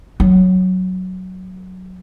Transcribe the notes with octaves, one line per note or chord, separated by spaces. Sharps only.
F#3